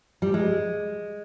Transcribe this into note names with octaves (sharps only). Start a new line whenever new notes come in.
G3
G#3